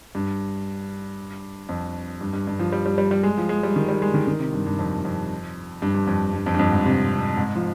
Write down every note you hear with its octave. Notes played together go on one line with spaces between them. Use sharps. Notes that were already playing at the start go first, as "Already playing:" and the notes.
G2
F2
G2
G2
G2
F3
G3
G3
G3
G3
G#3
F3
G#3
G3
D#3
G3
G#3
D#3
D#3
C3
G2
G2
F2
F2
G2
G2
F2
G2
F2
G2
F2
G#2
C3
G#2
F3